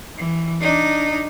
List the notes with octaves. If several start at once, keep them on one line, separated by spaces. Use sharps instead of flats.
E3
D4 D#4